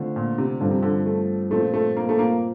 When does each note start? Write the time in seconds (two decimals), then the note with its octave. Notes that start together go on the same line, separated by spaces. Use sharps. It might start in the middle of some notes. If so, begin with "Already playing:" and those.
Already playing: D3 A3 C4 F4
0.16 A#2
0.38 C3
0.60 G2 D3 F3 C4 F4
0.71 C3
0.82 D3
1.06 A3
1.51 A#2 F3 A3 C4
1.74 A3
1.97 A#3
2.09 A3
2.19 A#3